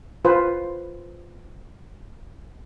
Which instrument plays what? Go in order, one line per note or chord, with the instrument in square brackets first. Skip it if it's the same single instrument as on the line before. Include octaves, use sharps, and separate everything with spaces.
[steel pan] F4 B4 C5